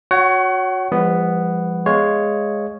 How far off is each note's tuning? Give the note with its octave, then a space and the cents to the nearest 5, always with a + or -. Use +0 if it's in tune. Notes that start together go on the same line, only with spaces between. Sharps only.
F#4 -20 C#5 +5 F#5 +30
F3 -20 G#3 -45 B3 +0
G#3 +0 C#5 +0 F5 -5